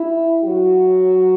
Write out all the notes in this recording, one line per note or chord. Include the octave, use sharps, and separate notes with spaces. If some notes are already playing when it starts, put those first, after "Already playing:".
Already playing: E4
F#3 F#4